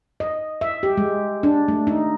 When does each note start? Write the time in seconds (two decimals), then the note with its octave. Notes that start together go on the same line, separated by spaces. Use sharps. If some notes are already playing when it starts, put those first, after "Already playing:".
0.20 D#5
0.61 E5
0.83 G4
0.97 G#3
1.43 D4
1.68 A3
1.87 D#4